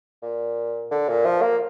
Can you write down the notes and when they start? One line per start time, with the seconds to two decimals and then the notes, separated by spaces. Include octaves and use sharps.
0.22 A#2
0.91 D3
1.09 A#2
1.25 F3
1.42 A#3